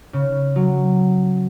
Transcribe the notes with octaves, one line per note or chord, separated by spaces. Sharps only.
C#3
F#3